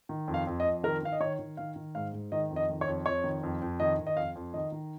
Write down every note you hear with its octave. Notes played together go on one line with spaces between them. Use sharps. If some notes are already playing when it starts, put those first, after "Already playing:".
D#3
F2
F5
F2
D#5
F2
D#3 A#4
D#3 F5
D#5
D#3 C#5
D#3
D#3 F5
D#3
G#2 F5
G#2
D#3 D#5
F2
D#5
D#3
C#5
F2
F2 C#5
D#3
F2
F2
D#3 D#5
D#3
D#5
F2 F5
F2
D#3 D#5
D#3